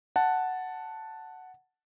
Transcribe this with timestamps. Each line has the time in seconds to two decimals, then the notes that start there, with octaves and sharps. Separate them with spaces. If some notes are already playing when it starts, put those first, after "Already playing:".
0.16 F#5 A5